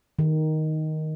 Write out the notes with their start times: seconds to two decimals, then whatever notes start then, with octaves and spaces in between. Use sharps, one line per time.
0.19 D#3